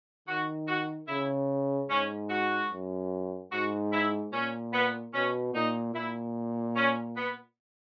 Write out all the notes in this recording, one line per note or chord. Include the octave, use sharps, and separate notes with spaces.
D#3 F#4
F#4
C#3 E4
G#2 C#4
F#4
F#2
G#2 F#4
E4
A#2 C#4
B3
B2 C#4
A#2 D#4
A#2 E4
C#4
B3